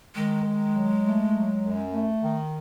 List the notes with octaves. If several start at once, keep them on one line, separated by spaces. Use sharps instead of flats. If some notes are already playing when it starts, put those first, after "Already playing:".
D#3 G#3
D#3
F#3
A3
F#3
F#2
A3
D#3